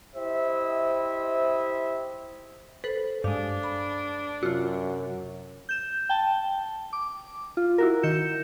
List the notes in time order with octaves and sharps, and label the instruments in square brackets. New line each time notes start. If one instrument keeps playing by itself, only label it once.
[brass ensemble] E4 G4 C5 D#5 E5
[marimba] A4 C5 [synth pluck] B4
[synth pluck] G2 G#3 [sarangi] D4 [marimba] F5
[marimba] B5
[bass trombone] F#2 [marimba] C3 [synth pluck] F4 F#4
[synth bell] G6 E7
G5 A5
D6
F4
E4 F#4 A#4
D#3 G6 C#7 E7